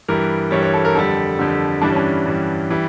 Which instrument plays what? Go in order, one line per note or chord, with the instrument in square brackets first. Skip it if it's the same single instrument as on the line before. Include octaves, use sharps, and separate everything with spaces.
[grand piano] G2 E3 G3 A#4
G2 E3 G3 C#5
C#5
A4
A#4
F2 D3 G3 A4
F2 D3 G3
G2 E3 G3 D4
C#4
D4
G2 E3 G3
E3 G3